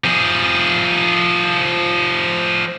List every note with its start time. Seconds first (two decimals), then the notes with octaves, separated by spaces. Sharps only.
0.04 F3 G#4